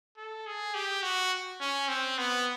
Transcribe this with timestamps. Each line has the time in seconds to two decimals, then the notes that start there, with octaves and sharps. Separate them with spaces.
0.17 A4
0.46 G#4
0.74 G4
1.02 F#4
1.61 C#4
1.89 C4
2.18 B3